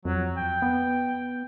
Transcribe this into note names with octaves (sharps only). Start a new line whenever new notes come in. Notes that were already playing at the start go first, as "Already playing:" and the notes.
F2 F#3
G5
B3